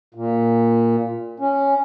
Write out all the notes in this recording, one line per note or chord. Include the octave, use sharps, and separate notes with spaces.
A#2
C#4